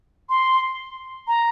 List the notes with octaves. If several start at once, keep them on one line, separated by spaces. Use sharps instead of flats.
C6
A#5